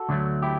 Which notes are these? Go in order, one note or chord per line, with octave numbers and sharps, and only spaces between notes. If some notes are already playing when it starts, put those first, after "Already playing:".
Already playing: F#4 A4
D2 D3 F#3 A3
E4 G4